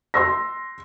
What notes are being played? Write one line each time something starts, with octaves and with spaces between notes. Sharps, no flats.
C6 E6 A#6